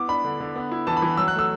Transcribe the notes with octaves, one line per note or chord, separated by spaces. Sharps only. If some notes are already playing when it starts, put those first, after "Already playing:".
Already playing: B3 E4 D6
D4 B5
D3
D3
B3
E4
E3 A5
B5
E3
F#3 E6
F#6
A3
E6